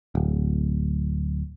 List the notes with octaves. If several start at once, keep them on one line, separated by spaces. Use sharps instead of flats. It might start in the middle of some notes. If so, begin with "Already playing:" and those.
D1